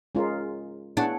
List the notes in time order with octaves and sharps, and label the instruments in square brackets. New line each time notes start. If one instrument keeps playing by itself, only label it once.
[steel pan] G#3 C#4 F4 A#4
[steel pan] B3 E4 G#4 C#5 F#5 [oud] D4